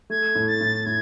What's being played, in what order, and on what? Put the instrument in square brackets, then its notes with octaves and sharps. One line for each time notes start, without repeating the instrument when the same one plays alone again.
[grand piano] A3 [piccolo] G#6
[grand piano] A2
[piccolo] A6
[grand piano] A2
[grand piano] A2 [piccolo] G#6